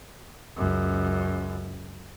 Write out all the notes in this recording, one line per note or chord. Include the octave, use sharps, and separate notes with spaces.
C#2 F#2